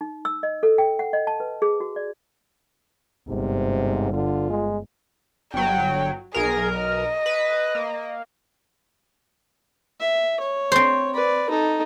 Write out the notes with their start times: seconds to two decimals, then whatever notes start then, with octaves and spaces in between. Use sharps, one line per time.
0.01 D#4
0.25 E6
0.43 D#5
0.63 A4
0.78 G5
0.99 F#5
1.13 D#5
1.27 A5
1.40 B4
1.62 G#4
1.80 F#4
1.96 D5
3.29 G1 G#2 C3
4.13 D3 F4
4.50 G#3
5.54 G1 F#3 G5
6.34 B1 G#4 A#4
6.77 D#5
7.26 B4
7.75 A#3
10.00 E5
10.40 C#5
10.72 C4 C5
11.14 B4 D5
11.50 D#4 A4